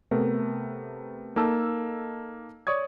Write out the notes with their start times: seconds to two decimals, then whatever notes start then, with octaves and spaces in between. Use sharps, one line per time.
0.11 C3 A3 B3 A#4 B4
1.36 A#3 D#4 A4 A5 E6
2.67 C#5 D5 C#6 D#6 G#6